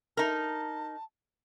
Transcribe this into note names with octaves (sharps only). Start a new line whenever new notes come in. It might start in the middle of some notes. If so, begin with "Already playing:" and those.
D#4 A#4 A5